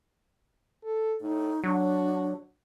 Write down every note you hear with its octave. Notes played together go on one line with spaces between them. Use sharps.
A4
A2 D#4
F#3 D4 F#4